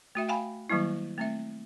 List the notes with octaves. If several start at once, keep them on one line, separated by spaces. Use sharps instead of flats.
A3 F#4 E5 G5
F5 G5 G#5 B5
D#3 F#3 G3 A#3 E4
A3 C4 E5